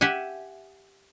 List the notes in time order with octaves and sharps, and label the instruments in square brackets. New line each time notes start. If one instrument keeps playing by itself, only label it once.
[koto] G4 E5 F#5 G#5